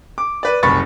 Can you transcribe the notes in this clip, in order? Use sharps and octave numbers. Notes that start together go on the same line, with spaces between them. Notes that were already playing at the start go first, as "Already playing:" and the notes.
D6
B4 D5
F#1 C2 B5 C#6 A6